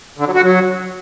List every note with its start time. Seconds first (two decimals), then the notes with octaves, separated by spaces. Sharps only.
0.18 D3
0.26 F#3
0.35 F#4
0.43 F#3